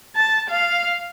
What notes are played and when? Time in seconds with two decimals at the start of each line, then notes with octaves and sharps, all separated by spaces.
0.16 A5
0.50 F5